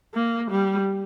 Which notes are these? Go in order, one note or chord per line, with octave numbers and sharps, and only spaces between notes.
A#3
G3